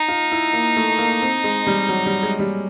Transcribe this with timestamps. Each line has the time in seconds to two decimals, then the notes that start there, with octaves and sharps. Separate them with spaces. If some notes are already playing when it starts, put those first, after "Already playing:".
Already playing: D#4
0.08 F4
0.32 E4
0.53 A#3
0.76 A3
0.98 A#3
1.22 C4
1.44 G#3
1.67 G3
1.89 F#3
2.06 G3
2.23 G#3
2.39 G3